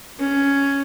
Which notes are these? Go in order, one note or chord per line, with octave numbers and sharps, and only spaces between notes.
C#4